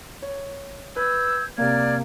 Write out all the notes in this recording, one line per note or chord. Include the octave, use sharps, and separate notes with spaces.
C#5
B4 E6 G6 G#6
C3 A#3 D5 F6 G#6